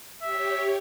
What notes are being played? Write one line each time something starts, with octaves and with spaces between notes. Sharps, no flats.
G4 C#5 E5